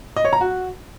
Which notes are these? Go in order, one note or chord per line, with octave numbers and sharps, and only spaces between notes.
D#5
C#5
A#5
F#4